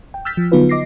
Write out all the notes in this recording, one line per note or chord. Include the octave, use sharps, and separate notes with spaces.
G5
E6 F6 G6 A6 B6
F3
D3 F#3 B3 D#4 F4 B4
D#5 D6 A#6 C7